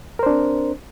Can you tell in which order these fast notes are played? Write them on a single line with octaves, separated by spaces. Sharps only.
A#4 C5 D4 C4